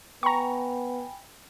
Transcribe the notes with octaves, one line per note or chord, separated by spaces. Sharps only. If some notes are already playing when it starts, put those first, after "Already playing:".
B3 G5 G#5 A#5 B5 C#6